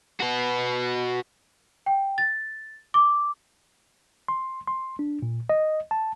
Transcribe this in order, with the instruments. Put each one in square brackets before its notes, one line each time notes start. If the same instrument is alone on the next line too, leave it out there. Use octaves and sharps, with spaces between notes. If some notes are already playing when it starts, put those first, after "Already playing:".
[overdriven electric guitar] F#4 B4
[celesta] G5
A6
D6
[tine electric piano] C6
C6
D4
A#2
D#5
A5